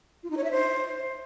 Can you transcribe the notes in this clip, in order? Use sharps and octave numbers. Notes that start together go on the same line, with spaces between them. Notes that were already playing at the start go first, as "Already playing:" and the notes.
F4
D#4
C#5
E5
C5